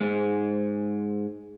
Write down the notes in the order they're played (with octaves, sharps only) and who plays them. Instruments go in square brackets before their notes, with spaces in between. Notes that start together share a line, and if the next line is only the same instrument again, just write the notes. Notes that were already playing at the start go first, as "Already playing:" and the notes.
[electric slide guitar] G#2 G#3